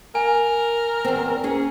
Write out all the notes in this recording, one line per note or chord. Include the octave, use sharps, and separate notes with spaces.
A#4 G#5
E2 C4
C#4 G#4